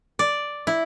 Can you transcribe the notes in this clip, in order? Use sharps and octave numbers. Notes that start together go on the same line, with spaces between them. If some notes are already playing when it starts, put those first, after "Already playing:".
D5
E4